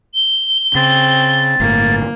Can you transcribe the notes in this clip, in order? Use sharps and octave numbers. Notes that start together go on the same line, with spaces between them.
G7
C#3 C4 A6
G1 A2 A#3